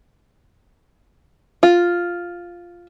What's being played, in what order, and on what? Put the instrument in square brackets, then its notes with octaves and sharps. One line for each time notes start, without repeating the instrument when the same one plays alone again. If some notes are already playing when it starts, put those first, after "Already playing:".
[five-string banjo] F4